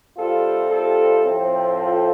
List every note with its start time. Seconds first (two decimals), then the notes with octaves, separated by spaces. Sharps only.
0.17 C3 G3 C4 F4 A4
0.71 F4 A4
1.24 A2 F3 C4
1.78 F4 A4